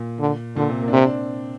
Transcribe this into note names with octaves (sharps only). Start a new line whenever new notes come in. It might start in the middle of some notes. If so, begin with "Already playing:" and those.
Already playing: A#2
D3
A#2 D3
C3
A#3
D4
C3 C4
D4